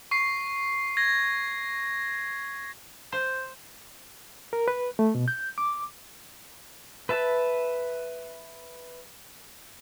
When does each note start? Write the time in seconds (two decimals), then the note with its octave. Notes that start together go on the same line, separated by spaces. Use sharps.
0.11 C#6 C7
0.97 G#6 A#6
3.12 C5
4.53 A#4
4.68 B4
4.99 A3
5.15 B2
5.28 G6
5.58 D6
7.09 B4 E5 A5